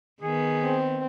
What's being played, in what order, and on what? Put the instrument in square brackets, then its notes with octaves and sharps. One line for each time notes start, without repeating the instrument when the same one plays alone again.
[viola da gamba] D#3 B3 [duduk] G#4
[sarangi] C4